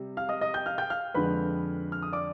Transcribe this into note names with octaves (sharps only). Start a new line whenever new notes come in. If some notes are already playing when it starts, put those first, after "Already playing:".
Already playing: C3 G3
F5 F6
D#5 D#6
D#5 D#6
G5 G6
F5 F6
G5 G6
F5 F6
F2 D3 G#3 B4 B5
F6
D#6
D5 D6